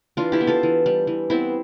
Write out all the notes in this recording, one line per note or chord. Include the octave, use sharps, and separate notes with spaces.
E3 D4 F4
E4 G4
B3
F4 A4
E3
G3
E3
B3 C4 E4